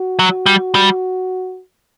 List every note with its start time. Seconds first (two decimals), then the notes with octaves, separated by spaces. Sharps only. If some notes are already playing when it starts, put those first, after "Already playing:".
Already playing: F#4
0.19 F#3
0.46 G3
0.75 G3